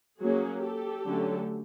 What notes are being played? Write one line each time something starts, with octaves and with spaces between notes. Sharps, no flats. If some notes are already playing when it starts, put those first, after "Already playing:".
F#3 A#3 C#4 F#4 G#4
G4 A4
D3 F#3 A3 C#4